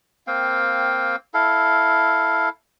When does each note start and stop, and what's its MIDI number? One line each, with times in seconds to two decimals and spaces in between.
0.27 1.16 58
0.27 1.16 60
0.27 1.16 77
0.27 1.16 79
1.34 2.49 64
1.34 2.49 69
1.34 2.49 77